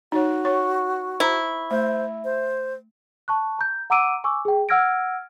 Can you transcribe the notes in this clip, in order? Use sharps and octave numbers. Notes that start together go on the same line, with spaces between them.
D#4 F#4 C#5
C#5 C#6
E4 C5 A#5
A3 C5 E5
C5
A5 C#6 F#6
A#5 G6
F#5 A#5 D6 E6 D7 D#7
G#5 C#6 D6 E6
G#4 G5
F#5 E6 F6 G#6 A#6 D7